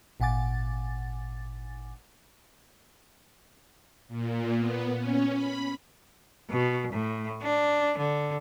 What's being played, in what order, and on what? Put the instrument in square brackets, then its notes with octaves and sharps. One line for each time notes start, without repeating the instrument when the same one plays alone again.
[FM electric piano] G#1 A#2 F#5 G#5 D6 A6
[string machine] A#2
B3
C#4
B5
[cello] B2
A2
D4
D3